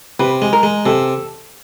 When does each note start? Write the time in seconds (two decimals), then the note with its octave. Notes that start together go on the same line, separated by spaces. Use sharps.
0.19 C3 B4
0.42 G#3
0.53 A#4
0.63 G#3
0.86 C3 A4